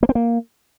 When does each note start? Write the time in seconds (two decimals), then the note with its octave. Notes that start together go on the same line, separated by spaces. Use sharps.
0.03 A#3
0.09 C4
0.15 A#3